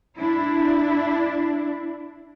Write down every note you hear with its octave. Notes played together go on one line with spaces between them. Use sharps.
D4 E4